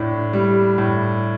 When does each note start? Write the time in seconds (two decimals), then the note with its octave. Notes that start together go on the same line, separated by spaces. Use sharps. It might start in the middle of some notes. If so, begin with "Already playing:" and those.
Already playing: A2 D4
0.33 G3
0.78 A2